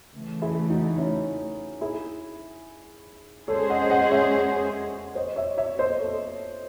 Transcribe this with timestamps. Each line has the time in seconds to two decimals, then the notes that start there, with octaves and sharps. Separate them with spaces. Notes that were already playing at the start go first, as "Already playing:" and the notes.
0.13 C#3 E3 A3
0.42 E4 G#4
0.70 D#4 F#4
0.98 C#4 E4
1.81 E4 G#4
3.48 G#3 C#4 G#4 A4 C5 C#5
3.70 D#5 F#5
3.90 D#5 F#5
4.11 C#5 E5
5.15 C5 D#5
5.36 C#5 E5
5.58 C#5 E5
5.79 C5 D#5
5.99 A4 C#5